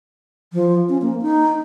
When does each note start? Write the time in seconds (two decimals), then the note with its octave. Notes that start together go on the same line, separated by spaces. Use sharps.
0.53 F3
0.89 C#4
1.02 A#3
1.22 D#4